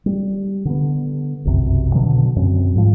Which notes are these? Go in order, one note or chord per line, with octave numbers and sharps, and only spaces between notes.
G3
D3 B3
F1 B1 F#2 C3
B2 D3 D#3 F#3
F#2 C4
G#2 D#3 F3 G3